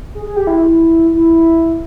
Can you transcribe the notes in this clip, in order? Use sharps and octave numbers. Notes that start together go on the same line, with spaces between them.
G#4
G#4
G4
E4
E4